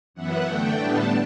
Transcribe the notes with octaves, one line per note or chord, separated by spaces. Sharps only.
F#2 E3 B3 E4 F#5
D3 A3 D4 G5
A2 G3 B3 D4 A5